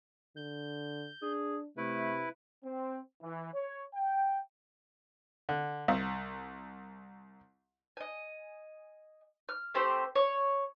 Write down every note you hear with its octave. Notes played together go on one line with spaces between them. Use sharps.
D3 G6
D4 G#4
C3 A3 E4 B4
C4
E3
C#5
G5
D3
C2
D#5 G#5
F6
A3 C4 G4 C5
C#5